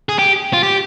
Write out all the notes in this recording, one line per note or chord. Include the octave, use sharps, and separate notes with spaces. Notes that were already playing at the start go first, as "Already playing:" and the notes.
G#4
G4
F4
G4